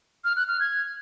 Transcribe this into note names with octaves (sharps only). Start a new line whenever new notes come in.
F6
F#6
F6
G#6